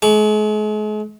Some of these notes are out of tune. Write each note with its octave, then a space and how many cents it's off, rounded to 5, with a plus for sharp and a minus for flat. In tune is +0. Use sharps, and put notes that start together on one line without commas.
G#3 +40 C#6 +40